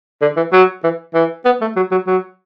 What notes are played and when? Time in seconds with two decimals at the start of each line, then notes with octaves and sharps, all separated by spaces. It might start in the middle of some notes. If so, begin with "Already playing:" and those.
0.22 D3
0.37 E3
0.53 F#3
0.84 E3
1.14 E3
1.45 B3
1.61 A3
1.76 F#3
1.91 F#3
2.07 F#3